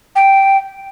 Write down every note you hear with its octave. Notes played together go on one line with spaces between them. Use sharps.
G5